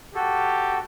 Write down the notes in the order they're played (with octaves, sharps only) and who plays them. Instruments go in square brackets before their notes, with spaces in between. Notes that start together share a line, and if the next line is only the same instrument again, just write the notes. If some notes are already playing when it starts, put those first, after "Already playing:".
[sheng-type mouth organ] F#4 A4 [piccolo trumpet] G4